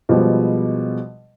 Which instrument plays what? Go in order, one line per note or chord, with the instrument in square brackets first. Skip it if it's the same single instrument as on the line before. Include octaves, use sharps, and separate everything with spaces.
[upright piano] B2 F3 G3 G#3